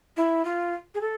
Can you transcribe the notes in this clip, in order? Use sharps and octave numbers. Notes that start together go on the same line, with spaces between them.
E4
F4
G#4
A4